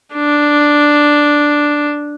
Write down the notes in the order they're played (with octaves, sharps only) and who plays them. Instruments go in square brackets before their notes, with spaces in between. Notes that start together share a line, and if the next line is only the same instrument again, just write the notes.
[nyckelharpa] D4